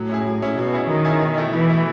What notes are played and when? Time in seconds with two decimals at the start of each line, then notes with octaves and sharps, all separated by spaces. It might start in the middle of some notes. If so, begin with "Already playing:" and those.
Already playing: A2 F#3
0.09 C#4 E4 G#4
0.25 F#3
0.42 C#4 E4 G#4
0.57 B2 F#3
0.73 C#4 E4 G#4
0.89 D#3 F#3
1.05 C#4 E4 G#4
1.21 B2
1.38 A3 E4
1.52 B2 E3
1.69 A3 E4